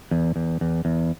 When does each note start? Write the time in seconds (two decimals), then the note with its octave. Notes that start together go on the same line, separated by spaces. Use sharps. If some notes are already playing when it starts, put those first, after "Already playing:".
0.11 E2
0.36 E2
0.61 E2
0.85 E2